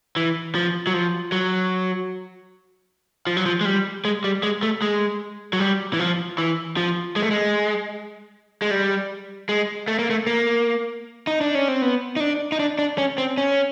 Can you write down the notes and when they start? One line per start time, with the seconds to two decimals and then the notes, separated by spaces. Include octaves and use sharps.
0.16 E3
0.55 F3
0.87 F#3
0.94 F3
1.32 F#3
3.27 F3
3.37 F#3
3.46 F3
3.61 G#3
3.65 G3
4.05 G#3
4.24 G3
4.43 G#3
4.63 A3
4.82 G#3
5.53 F#3
5.60 G3
5.93 E3
5.99 F3
6.38 E3
6.77 F3
7.16 G#3
7.22 A3
7.31 G#3
8.62 G#3
8.71 G3
9.49 G#3
9.88 A3
9.99 A#3
10.10 A3
10.27 A#3
11.27 D#4
11.41 D4
11.55 C#4
11.68 C4
11.82 B3
12.16 D#4
12.20 D4
12.52 D#4
12.60 D4
12.79 D4
12.98 C#4
13.18 C4
13.38 C#4